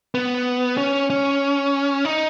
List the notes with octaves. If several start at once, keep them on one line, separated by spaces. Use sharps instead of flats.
B3
C#4
C#4
D#4